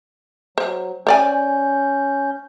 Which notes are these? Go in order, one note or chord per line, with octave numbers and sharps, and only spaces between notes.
F#3 C5
C#4 C5 D5 G#5 G6